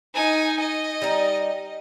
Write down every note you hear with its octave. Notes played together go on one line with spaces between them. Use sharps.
D#4 G#5
D#5
G3 D#4